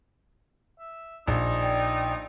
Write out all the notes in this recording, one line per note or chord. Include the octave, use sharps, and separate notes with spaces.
E5
A#1 D#4
D5 G5